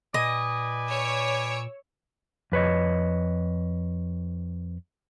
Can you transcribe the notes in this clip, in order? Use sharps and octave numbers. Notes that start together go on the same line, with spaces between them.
A#2 B4 D5 D#5 G#5
C#5 E6 D7
F2 B4 C#5 D#5